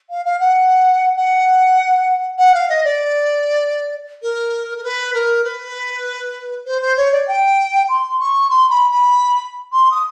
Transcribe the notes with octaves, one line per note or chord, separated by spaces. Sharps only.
F5
F5
F#5
F#5
F#5
F5
D#5
D5
A#4
A#4
B4
A#4
B4
C5
C5
C#5
D5
G5
C6
C#6
C6
B5
B5
C6
D#6